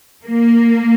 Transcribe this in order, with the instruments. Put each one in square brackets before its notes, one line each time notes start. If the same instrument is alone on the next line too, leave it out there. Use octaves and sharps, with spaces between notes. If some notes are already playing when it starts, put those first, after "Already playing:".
[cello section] A#3